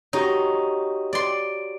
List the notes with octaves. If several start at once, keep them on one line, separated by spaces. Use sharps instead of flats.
D#4 F#4 G4 C#5 D#5
D5 C6